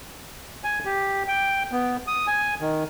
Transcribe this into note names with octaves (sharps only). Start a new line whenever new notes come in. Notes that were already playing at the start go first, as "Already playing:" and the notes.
G#5
G4
G5
B3
D#6
G#5
D#3